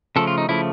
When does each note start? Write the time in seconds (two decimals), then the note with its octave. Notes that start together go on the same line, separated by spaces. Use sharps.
0.16 C#3 F3 A3 A4
0.27 F4
0.38 D#4
0.49 C#3 F3 A3 E4